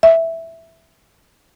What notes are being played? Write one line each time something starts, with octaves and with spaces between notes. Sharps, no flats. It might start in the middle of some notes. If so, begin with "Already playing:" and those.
E5